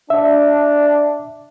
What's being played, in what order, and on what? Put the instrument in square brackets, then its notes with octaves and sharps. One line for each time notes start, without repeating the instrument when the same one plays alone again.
[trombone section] D4 [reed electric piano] E5